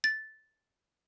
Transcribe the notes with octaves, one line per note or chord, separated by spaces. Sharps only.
A6